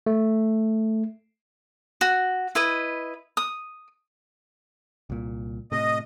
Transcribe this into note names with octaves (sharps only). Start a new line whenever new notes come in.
A3
F#4
E4 B4 D#5
D#6
C2 A#2
A2 C3 D#5